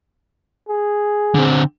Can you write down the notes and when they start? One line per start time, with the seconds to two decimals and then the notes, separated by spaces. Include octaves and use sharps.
0.69 G#4
1.35 D3 C4